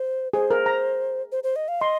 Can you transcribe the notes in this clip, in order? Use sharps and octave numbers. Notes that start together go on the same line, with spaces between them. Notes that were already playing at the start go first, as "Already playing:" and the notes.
Already playing: C5
G#4 C5
A#4
A#5
C5
C5
D#5
F5
D#5 C6